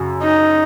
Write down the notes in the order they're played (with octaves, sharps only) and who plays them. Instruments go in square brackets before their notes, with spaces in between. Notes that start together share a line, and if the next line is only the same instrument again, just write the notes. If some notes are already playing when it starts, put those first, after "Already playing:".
Already playing: [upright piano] F#2 C#3
[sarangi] D#4